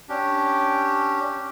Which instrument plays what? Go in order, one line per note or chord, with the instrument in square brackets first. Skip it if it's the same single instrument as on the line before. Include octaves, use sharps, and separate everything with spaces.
[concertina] C#4 D4 G4